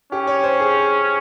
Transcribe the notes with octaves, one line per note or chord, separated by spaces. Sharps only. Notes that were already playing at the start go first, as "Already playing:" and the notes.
C#4 G4
C#5
C5
G#4